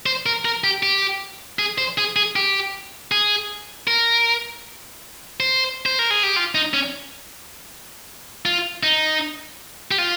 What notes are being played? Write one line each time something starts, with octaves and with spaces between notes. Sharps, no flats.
C5
A#4
A#4
G4
G4
G#4
C5
G#4
G#4
G4
G#4
A#4
C5
C5
A#4
G#4
G4
F4
D#4
C#4
F4
D#4
G4
F4